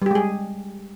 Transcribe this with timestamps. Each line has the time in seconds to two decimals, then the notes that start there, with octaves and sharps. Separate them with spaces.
0.02 G3
0.06 G4
0.11 G#3
0.15 G#4